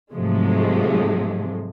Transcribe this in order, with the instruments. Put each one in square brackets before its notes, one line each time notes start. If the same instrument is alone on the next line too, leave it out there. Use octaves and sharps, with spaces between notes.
[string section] G#2 C3 F3 F#3 G#3 A3